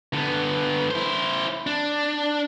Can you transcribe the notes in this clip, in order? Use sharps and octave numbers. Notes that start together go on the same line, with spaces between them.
D3 B3
E4 C5
D4